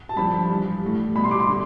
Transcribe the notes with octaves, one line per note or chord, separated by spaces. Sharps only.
A5
G2 D3 F3 B5
G2 E3 G3
A2 G3
B2 G3 B5
C6
D6
C6
D3 G3